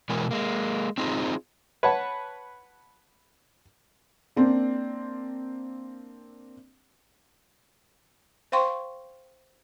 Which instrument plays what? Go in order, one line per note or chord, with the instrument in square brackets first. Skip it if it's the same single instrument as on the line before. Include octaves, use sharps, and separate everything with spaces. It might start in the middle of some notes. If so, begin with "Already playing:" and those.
[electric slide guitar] B2 E3 G#3 A#4 G#5
G#3 A#3
C4 D#4 F4 G#4 C5
[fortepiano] B4 C#5 F#5 A5
[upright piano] A#3 C4 D4
[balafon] C5 F5 G5 C6 C#6